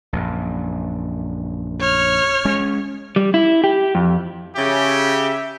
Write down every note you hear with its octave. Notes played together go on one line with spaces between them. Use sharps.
A#1 F#2
C#5 F6
G#3 C#4
G3
E4
G4
F2
C#3 G4 E5